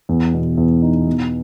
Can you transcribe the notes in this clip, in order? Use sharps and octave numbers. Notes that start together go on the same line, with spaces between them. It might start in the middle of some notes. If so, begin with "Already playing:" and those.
E2
B2
E2
D#4
B2